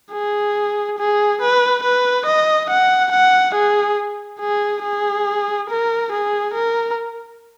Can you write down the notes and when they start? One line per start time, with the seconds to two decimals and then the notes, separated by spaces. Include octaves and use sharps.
0.12 G#4
0.99 G#4
1.41 B4
1.83 B4
2.26 D#5
2.70 F#5
3.12 F#5
3.54 G#4
4.40 G#4
4.84 G#4
5.69 A#4
6.12 G#4
6.54 A#4